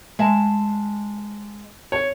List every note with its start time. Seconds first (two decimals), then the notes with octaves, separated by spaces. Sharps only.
0.19 G#3 E5 A5
1.92 C#5